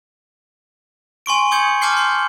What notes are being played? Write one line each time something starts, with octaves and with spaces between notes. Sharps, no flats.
G#5 C6 C#6 D7
C#6 D#6 G6 G#6 C#7 F#7
A5 D6 F6 G6 C7 G7
C6 G6